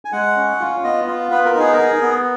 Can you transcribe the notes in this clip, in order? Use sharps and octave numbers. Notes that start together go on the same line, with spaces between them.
G#5
G#3 F#5
C#4
F4
B3 D#5
F4
B3 B4
A#4
D#4 G#4
A#4
G#4
B3